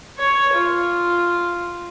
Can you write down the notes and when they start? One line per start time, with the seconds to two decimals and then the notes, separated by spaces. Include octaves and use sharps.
0.18 C#5
0.54 F4